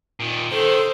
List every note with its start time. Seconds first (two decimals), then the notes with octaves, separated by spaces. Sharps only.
0.20 A#2 D#3
0.52 D#3 A4 C5